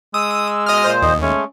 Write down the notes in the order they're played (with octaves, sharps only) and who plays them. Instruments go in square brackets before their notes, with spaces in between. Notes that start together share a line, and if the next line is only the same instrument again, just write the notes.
[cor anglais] G#3 [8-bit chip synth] D#6 [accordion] E6
[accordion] B2 [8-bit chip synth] D#5 D#6 F6
[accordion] A#2 C5
[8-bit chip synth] D#2 [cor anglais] D#5
[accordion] G#3 A3 [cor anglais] C#4